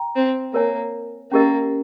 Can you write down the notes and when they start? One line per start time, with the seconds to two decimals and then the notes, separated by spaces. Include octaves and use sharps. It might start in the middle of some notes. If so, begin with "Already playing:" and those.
Already playing: G5 A#5
0.16 C4
0.53 A#3 A#4 C#5 G#5
1.32 A#3 C#4 G4 A#4 D#5